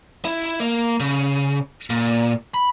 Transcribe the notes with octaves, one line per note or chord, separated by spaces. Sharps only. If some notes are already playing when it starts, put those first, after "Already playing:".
E4
A#3
C#3
A#2
B5